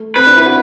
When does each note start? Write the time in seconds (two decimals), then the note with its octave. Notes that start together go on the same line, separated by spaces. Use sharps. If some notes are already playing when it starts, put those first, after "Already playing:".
Already playing: A3
0.16 C4 B4
0.27 D4
0.36 E4
0.46 F#4